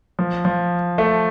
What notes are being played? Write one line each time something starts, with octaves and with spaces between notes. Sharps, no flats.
F3
F3
A3